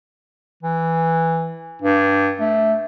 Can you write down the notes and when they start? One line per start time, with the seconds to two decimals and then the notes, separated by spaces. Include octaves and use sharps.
0.63 E3
1.82 G2
2.41 A3